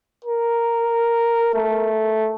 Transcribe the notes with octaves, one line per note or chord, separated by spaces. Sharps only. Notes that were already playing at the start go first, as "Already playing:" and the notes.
A#4
A3